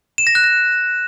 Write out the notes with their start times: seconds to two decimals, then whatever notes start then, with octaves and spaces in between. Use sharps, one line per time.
0.18 E7
0.27 A#6
0.35 F#6
0.44 A#6